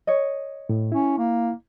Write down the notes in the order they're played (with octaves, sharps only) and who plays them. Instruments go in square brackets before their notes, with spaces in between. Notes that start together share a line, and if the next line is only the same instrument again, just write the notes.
[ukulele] C#5 D#5
[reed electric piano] A2
[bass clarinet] C#4 [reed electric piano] E4
[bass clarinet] A#3